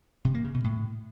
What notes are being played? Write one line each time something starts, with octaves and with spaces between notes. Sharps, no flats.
C3
A#3
C#3
B2
A2